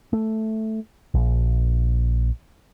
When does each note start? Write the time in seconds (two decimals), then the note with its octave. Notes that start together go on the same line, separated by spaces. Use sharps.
0.13 A3
1.14 A#1